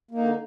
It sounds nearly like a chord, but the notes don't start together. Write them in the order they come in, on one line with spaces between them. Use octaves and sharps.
A#3 D#4 D3